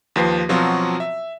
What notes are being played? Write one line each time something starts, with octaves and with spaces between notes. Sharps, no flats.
D#2 F3 B4 C7
B2 F3 F#3 C4 F4 F#4
E5